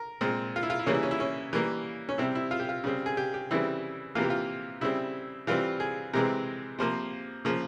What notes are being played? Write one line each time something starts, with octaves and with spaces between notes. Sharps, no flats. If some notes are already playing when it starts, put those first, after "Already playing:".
Already playing: A#4
A#2 G#3 C4
F4
E4
F4
E4
C#3 E3 G3 A#3 C#4
E4
C#4
E4
C#4
E3 G3 A#3
C#4
C3 G3 C4 E4
E4
F4
G4
F4
C#3 G3 C4
G#4
G4
G4
C#3 E3 G3 C4 E4
C3 E3 A#3 F4
G4
F4
C#3 G3 C4 E4
E3 G3 C4 F4
G#4
C3 E3 G#3 C4 A#4
C3 F3 A#3 C5
C#3 F3 A#3